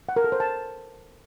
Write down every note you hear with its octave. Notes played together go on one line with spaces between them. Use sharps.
F#5
A#4
A4
C5
A5